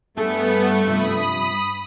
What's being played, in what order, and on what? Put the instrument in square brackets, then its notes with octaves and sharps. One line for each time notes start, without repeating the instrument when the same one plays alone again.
[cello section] G2 [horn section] A3 [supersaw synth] B3 [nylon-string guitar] G#4 A4
[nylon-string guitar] C3 F3 [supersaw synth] B5 D#6